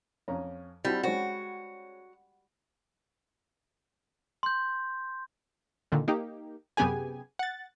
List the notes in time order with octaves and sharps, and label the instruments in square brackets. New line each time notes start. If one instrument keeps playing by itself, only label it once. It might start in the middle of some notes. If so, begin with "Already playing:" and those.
[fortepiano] F2 C#4 A#5
[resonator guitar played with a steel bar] G3 [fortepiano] C4 E4 F#4
[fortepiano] G#3 C#4 C5 [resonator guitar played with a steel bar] F#4
[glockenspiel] C6 G6
[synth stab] A#2 D3 D#3
A#3 D#4 G4
F#2 C3 B3 G4 G#4 G#5
F#5 A6